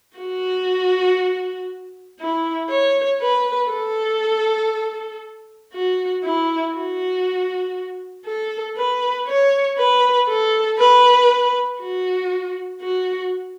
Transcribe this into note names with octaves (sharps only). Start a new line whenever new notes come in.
F#4
E4
C#5
B4
A4
F#4
E4
F#4
A4
B4
C#5
B4
A4
B4
F#4
F#4